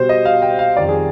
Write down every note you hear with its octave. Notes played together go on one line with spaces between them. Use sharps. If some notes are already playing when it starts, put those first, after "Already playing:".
Already playing: B2 G3 C5
D#5
F5
G5
F5
F2 D#3 G3 D5
G#4